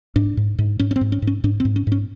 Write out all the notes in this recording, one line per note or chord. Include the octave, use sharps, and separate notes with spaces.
G#2 D4
G#2
G#2
G#2 C#4
C#4
C4
G#2
C#4
G#2
C#4
G#2 D4
C4
G#2
C#4
G#2 C#4